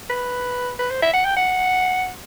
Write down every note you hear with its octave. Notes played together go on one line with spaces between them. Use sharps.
B4
B4
C5
E5
F#5
G5
F#5